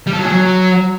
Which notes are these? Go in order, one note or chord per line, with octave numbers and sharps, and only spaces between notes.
G3
A4
F#3
G#4
F#3